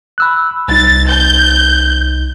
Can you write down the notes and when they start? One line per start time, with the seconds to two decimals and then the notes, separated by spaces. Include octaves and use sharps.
0.18 B5 E6 F#6
0.68 C2 D#4 A6
1.08 G6